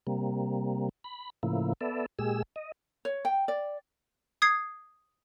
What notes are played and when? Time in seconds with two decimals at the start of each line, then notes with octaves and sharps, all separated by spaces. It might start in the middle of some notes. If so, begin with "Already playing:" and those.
0.07 C3 G3 A#3
1.04 B5
1.43 A2 C#3 F3 A#3 E4
1.81 B3 A4 D5 E5
2.19 A#2 G#3 G4 G#4 E6
2.56 D#5
3.05 C#5
3.25 G5
3.48 D5
4.42 D#6 G#6 C7